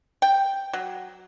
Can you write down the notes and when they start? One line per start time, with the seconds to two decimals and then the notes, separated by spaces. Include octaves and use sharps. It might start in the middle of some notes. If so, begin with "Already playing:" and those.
0.22 G5
0.73 F#3